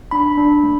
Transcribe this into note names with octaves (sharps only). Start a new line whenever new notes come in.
D4 B5
D4
A3